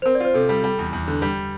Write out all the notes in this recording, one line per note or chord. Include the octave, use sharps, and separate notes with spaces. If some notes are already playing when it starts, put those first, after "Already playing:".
C5
C4 A#4
D5
F4 C5
C3 A4
G3
G3
E2
E2
D3
G3